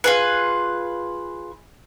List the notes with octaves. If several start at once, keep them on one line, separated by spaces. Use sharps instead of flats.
F4 G#4 B4